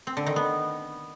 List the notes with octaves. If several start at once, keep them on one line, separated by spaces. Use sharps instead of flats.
C4
D3
D#3
B3